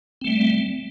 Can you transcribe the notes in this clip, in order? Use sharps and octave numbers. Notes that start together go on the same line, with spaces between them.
G3 A3 C4